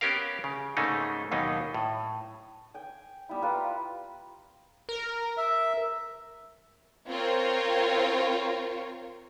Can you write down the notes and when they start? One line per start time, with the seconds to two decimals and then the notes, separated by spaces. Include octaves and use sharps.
0.01 B3 C#4 G4 A#4 F5
0.44 C#3
0.77 G#2 C#3 A3 A#3 C#4 D#4
1.31 D#2 B2 F#3 A#3 B3 D#4
1.74 A2
2.74 G5 G#5
3.29 G3 B3 E4
3.42 G3 F4 A#4 B4
4.89 A#4
5.37 E5
7.08 C4 F4 A#4 C#5